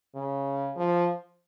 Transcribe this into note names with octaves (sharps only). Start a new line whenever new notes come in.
C#3
F3